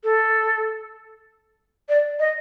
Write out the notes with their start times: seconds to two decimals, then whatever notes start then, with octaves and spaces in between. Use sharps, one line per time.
0.04 A4
1.89 D5
2.19 D#5